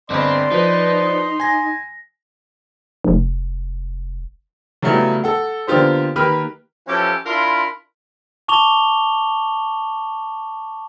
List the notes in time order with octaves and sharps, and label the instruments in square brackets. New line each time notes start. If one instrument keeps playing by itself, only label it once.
[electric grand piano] G1 D#5 B5 [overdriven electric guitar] C4 [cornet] D5 [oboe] C6
[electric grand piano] F3 B4 [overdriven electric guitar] D#4
[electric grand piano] G#5 A#6
[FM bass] F1
[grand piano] C#3 F#3 G3 A3 B3 E4
A4 F#5
D3 A#3 B3 F4 G4 C5
D#3 A#3 G4 B4 B5 F6
[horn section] E3 F3 C#4 G4 A4
D4 E4 F4 A#4 B5 C6
[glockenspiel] A5 C#6 D6 F7 G7